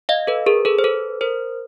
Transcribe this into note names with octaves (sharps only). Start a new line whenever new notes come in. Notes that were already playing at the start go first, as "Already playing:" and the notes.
D#5 F5
A4 B4
G#4 A#4
A4 B4
C5
A4 B4
A#4 C5